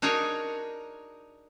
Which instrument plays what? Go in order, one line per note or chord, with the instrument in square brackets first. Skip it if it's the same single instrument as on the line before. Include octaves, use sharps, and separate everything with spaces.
[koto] D4 D#4 F#4 G#4 A#4 C#5